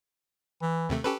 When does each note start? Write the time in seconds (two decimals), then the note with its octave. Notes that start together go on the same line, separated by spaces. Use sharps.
0.62 E3
0.89 D#2 C3 A3
1.04 C#4 G4 A4 B4